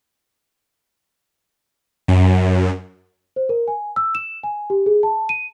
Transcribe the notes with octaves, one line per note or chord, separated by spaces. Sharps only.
F#2
C5
A#4
G#5
E6
E7
G#5
G4
G#4
A5
D#7